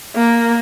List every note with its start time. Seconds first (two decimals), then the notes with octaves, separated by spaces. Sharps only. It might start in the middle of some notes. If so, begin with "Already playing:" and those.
0.16 A#3